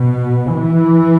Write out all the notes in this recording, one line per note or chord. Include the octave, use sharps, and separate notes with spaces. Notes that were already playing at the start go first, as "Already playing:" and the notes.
Already playing: B2
E3